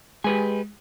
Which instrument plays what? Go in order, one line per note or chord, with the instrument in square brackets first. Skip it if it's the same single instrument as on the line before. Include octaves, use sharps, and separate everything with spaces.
[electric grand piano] G#3 [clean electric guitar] G4 B4 G#5